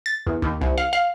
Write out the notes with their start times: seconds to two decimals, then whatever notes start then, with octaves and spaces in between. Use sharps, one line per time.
0.06 A6
0.27 E2
0.42 D#2
0.61 C2
0.78 F5
0.93 F5